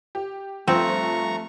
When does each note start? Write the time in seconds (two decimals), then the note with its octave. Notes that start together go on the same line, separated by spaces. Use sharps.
0.15 G4
0.68 G2 F3 A3 C4 A#5 C#6